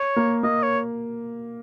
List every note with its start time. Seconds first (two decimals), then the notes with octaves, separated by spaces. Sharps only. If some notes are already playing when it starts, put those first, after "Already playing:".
Already playing: C#5
0.16 A#3
0.43 A#3 D#5
0.63 C#5